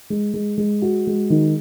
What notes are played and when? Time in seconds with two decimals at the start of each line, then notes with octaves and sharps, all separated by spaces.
0.10 G#3
0.33 G#3
0.58 G#3
0.82 F#4
1.07 G#3
1.30 D#3